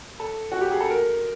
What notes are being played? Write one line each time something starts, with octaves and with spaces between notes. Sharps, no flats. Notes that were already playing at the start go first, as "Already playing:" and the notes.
A4
F#4
G4
G#4
A4
A#4